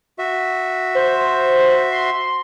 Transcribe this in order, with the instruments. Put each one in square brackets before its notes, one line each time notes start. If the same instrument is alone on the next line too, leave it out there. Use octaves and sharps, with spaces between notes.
[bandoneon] F#4 E5
[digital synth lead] C5
C6